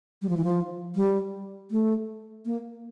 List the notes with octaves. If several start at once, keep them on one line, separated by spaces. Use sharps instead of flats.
G3
F3
E3
F3
G3
A3
A#3